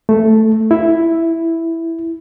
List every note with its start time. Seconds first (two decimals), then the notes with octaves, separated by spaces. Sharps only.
0.09 A3
0.71 E4